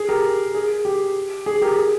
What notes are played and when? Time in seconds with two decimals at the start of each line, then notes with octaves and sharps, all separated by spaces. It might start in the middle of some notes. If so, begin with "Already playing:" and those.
Already playing: G#4
0.09 G4 A#4
0.55 G#4
0.85 G4
1.46 G#4
1.62 G4 A#4
1.77 G#4